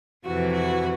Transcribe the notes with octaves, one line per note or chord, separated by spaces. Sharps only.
F2 C3 E3 F#4
F#4